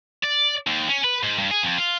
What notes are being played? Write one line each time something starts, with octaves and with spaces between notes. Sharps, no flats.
D5
D#2
C#4
B4
G#2
G2
G#4
F2
F4